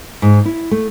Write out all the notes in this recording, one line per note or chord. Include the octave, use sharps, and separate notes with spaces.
G#2
E4
A3